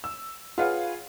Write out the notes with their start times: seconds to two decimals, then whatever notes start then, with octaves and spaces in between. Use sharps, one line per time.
0.04 E6
0.58 F4 G#4 B4 C#5 F5 F#5